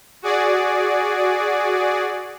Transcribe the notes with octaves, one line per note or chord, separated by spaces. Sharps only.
F#4 G#4 D5